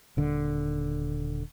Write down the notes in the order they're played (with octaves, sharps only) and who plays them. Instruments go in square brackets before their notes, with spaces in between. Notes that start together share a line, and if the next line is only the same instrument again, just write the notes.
[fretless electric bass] D#1 D3